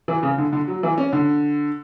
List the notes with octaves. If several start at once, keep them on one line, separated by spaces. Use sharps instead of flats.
E3
C#3
D3
D3
F#3
E3
C#4
D3